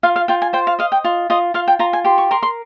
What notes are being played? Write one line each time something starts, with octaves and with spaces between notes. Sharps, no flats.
F4 F5
F5
F4 G5
G#5
C5 G5
F5
D#5 F5
G5
F4
F4 D#5
F4 F5
G5
F4 A#5
G#5
G4 C6
C#6
A#4 C6
C6